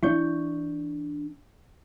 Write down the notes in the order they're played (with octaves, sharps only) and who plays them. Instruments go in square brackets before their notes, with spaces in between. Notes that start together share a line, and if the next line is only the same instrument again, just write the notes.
[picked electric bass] E3 C4 D4 [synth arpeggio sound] E4 C#6 G6